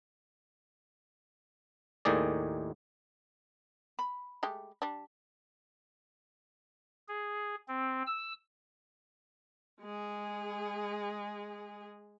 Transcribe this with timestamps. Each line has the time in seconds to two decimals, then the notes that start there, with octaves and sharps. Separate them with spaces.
2.05 D#2 A2 D#3 G#4 D5
3.99 B5
4.43 G#3 A3 G4
4.82 G3 D4
7.08 G#4
7.68 C4
8.07 E6
9.81 G#3 G#4